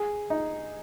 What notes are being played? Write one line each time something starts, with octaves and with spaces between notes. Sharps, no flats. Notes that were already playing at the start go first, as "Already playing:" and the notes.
Already playing: G#4
D#4